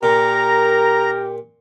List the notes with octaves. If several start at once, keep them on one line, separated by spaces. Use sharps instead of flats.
A#2 G4 A#4 A#5